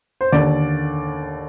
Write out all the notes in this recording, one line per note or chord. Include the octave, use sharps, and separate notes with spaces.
C5
D#2 D3 D5